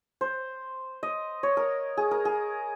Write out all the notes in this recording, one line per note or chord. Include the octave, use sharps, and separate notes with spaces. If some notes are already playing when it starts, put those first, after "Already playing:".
C5
D#5
C#5
A#4
G#4
A#4
G#4